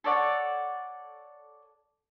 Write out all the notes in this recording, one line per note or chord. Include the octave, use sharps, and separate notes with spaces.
A4 C#5 D5 F#5